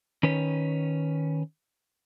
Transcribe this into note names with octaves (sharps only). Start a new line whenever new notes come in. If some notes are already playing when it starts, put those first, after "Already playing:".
D#3 C#4 B4 C#5